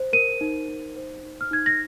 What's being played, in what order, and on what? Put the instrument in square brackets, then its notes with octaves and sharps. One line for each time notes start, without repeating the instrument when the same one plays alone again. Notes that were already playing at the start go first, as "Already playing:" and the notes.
Already playing: [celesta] C5
A#4 D#7
D#4
D#4
C5
D#4
F6
D#4 G#6
A#6